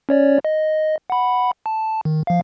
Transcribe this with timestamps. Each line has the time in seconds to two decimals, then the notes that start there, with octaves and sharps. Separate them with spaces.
0.09 C#4 C#5 D5
0.45 D#5
1.10 F#5 B5
1.66 A5
2.05 D#3
2.27 F3 F5